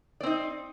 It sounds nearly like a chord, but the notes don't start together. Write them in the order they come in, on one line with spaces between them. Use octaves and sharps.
D5 C4 D#4